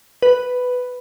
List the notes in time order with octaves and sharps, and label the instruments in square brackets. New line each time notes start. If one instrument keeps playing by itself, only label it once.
[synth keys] B4